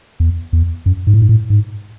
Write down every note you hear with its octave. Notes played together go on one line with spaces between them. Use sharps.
E2
E2
F#2
G#2
A2
G#2
A2
G#2